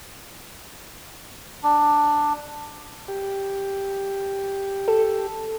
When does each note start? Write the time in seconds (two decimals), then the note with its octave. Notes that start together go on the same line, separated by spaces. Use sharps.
1.64 D4
3.08 G4
4.88 A4